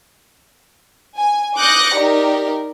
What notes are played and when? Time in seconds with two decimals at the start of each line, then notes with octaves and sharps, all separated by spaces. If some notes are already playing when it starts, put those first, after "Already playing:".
1.18 G#5
1.58 D6 D#6 F#6 G6 A#6 C#7
1.96 D#4 G4 A#4 D5